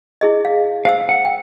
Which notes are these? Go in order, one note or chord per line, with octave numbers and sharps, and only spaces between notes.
E4 G#4 D#5
F5
C5 F5 E6
F#5
G5